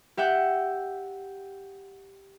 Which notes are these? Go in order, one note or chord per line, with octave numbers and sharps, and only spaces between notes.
G4 E5 F#5 G5